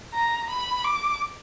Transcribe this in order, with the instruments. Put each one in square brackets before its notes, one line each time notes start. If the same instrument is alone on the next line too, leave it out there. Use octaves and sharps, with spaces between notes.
[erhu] A#5
B5
D6